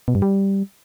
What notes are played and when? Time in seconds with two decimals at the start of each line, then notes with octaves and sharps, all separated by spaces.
0.08 B2
0.15 G2
0.22 G3